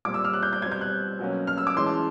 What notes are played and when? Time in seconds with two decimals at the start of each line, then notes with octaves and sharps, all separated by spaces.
0.05 A#2 G3 C4 D6
0.14 E6
0.25 F6
0.33 F#6
0.43 G6
0.53 G6
0.62 B2 G3 C4 G#6
0.72 G6
0.81 F#6
1.19 B2 F#3 A#3 C#4
1.47 F6
1.58 E6
1.67 D6
1.76 E3 G#3 C#4 C6
1.86 A5